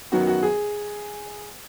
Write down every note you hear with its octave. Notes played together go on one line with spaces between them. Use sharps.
F#2 D#3 F#3 B3 F#4
F#4
G#4